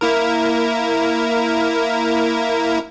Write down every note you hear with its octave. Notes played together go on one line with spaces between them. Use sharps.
A#3 E4 A#4